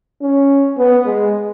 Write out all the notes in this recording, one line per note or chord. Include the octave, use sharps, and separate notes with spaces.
C#4
B3
G#3